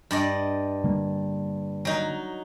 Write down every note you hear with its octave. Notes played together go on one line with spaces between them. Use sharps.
G2 D5 D#5
D3 G3 A#3
F#3 D#4